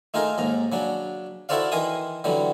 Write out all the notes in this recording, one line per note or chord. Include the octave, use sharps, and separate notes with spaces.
A3 D#4 F4 G#4 A#4
D#2 G#2 A#5
C#3 F#3 D4
E4 F#4 A4 C5 D5 F5
D#3 E3 A#4 G#5 C6 D#6
D3 E3 F#3 G3